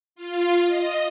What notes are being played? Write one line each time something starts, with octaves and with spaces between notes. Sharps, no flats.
F4
D#5